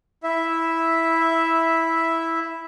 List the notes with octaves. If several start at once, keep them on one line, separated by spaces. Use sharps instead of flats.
E4 E5